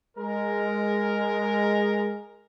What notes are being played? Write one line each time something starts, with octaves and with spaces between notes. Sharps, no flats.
G#3 A#4